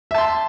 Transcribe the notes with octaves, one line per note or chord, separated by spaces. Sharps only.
E5 A5 C6